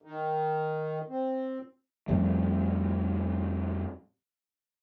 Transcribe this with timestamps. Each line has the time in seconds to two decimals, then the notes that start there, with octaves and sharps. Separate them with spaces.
0.02 D#3
1.09 C4
2.08 F2 F3 G3 A3